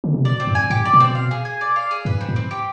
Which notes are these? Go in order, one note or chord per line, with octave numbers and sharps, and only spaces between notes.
D3
C3
B2 D5
C4
G2
G#5
G#2 G4
D5
B2
C4
F5
G#4
G#5
D5
F5
G#4
G2 B4
C4
G#2
C4
G4